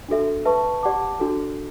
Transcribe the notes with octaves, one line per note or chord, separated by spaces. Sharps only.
D4 F#4 A4 E5
B4 E5 A5 C#6
G4 D5 F#5 A5 D6
D4 F#4 A4